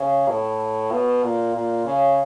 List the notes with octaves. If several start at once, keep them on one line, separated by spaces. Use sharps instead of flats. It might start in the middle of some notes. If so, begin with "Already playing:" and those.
Already playing: C#3
A2
B2
A#2
A#2
C#3